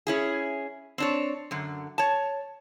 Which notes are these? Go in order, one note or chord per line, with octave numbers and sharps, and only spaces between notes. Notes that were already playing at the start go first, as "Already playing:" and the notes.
C#4 E4 G#4
C4 D4 C#5
F#2 D3
C#5 A5